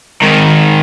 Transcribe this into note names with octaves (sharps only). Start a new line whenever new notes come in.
G#2 D#3